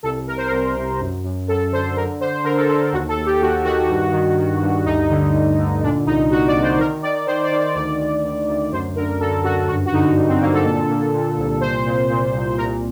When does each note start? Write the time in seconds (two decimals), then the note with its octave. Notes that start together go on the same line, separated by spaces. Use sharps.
0.03 C2 A4
0.27 C2 A#4
0.37 C5
0.47 C2 A#4
0.75 C3
1.00 F#2
1.24 F#2
1.48 F#2 A4
1.72 D3 C5
1.96 D3 A#4
2.20 D3 C5
2.44 D3 A#4
2.56 A4
2.68 D3 A4
2.92 D#2 F#4
3.08 A4
3.16 D#2
3.25 G4
3.41 D#2 F#4
3.65 D#3 F#4
3.89 G2
4.13 D#3
4.37 D#3
4.62 G2
4.85 D2 D#4
5.10 D3
5.34 D2
5.58 D3
5.82 A#2 D4
6.06 C2 D#4
6.30 A#2 F#4
6.47 D5
6.55 C2
6.62 C5
6.79 D#3 A#4
7.02 D#3 D5
7.26 D#3 C5
7.43 D5
7.51 D#3
7.60 D5
7.75 D2 D5
7.99 D2
8.24 D2
8.48 D2
8.71 F#2 C5
8.96 D3 A#4
9.20 D3 A4
9.44 F#2 F#4
9.68 G2 F#4
9.86 F#4
9.92 D3 D#4
10.17 G2
10.28 C4
10.41 D3 A#3
10.53 A4
10.65 A#2
10.89 A#2
11.14 A#2
11.37 C2
11.61 A#2 C5
11.86 A#2
12.10 A#2
12.34 C2
12.57 A#2 A#4